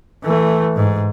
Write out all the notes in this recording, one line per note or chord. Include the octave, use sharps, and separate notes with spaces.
E3 A3
G#2